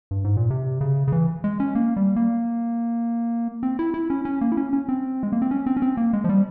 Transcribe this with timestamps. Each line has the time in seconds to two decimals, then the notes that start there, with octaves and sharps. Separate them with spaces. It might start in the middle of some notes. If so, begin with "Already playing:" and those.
0.11 G2
0.24 G#2
0.37 A#2
0.50 C3
0.81 C#3
1.08 C#3
1.12 E3
1.44 G#3
1.60 C#4
1.75 A#3
1.97 G3
2.16 A#3
3.63 C4
3.79 E4
3.94 E4
4.10 C#4
4.25 C#4
4.41 A#3
4.52 E4
4.57 C#4
4.73 C#4
4.89 C4
5.23 G#3
5.32 A#3
5.42 C4
5.51 C#4
5.66 C4
5.77 C#4
5.82 C4
5.97 A#3
6.13 G#3
6.24 F3
6.29 G3